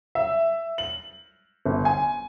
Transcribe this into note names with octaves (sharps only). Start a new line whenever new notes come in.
E5
F#7
G1
G#5